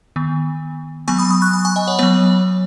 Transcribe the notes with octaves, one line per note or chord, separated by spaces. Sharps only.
D#3 B3
F#3 B3 G#5 C#6
B5 D#6
B5 D#6
C#6 F#6
B5 D#6
G#5 C#6
D#5 G#5
C#5 F#5
F#3 B3 C#5